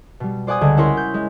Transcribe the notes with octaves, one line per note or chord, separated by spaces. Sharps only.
B2 G3
C5 D5 F#5 G#5 D#6 G#6
C#2 D3 G#6
C#4 E4 A#4 C#5 C6
G6
G#3